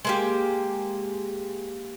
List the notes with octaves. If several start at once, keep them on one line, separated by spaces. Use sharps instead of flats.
G#3 A#3 G4